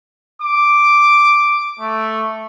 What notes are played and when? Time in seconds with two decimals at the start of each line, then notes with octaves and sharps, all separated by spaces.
0.42 D6
1.80 A3